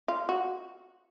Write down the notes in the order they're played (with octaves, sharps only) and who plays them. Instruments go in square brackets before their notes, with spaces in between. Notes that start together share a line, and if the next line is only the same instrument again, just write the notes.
[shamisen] F4
F#4